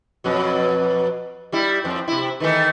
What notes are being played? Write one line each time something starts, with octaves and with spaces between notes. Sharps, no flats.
F2 B2 F#3
G3 E4
F2 C4
C3 E4
D#3 E3 A3